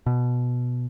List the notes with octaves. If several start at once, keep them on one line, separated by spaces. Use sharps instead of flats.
B2